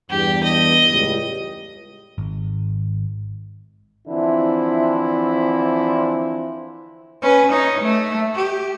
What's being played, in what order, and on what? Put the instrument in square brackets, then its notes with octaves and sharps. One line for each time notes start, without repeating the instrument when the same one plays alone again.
[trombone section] E2 G2 [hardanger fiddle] G4
[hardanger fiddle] D#5
[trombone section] C#2 A2 G3
[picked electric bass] G#1
[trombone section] D3 E3 F3 C4 E4
[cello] C#4 B4
D#4 C#5
A3
G4